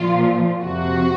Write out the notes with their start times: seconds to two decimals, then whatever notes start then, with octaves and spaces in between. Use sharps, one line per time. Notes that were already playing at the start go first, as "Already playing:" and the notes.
Already playing: A#2 F3 F4
0.63 F2 C3 F3 F#4